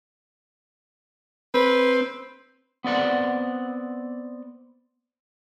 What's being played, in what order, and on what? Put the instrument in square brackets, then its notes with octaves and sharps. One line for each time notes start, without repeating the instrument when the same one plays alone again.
[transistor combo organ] C4 [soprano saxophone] B4
[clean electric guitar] B3 C4 D5 F#5